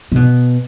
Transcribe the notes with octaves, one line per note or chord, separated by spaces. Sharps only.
C3
B2